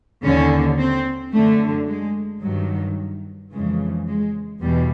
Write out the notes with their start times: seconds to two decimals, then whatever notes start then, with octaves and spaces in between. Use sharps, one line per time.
0.24 D#2 D3 C#4
0.79 C4
1.33 F#2 D3 A3
1.88 G#3
2.42 G2 D#3 F#3
3.52 F2 C#3 E3 G#3
4.07 G#3
4.61 E2 B2 G3